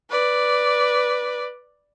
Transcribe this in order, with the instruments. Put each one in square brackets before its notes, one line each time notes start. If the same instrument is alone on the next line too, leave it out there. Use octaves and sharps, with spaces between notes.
[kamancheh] B4 D5